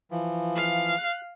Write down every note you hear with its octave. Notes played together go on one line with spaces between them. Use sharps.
E3 F3
F5
F#6